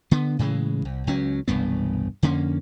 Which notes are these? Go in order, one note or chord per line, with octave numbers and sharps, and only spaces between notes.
D3 B3
A2 C#3 E3 G#3
C2
C#2 F#3 C#4
E1 C2 G2 B3
F2 D3 A#3 C#4